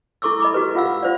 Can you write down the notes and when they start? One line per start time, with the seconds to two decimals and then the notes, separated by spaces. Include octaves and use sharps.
0.22 E4 A4 C#6 D6 E6
0.40 D#5 B5 D6
0.54 F#4 G4 B4
0.75 F4 F5 F#5 E6
1.03 F4 C5 D5